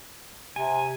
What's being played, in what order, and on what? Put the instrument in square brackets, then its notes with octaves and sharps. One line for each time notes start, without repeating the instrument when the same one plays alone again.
[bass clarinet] C3 [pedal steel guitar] G#5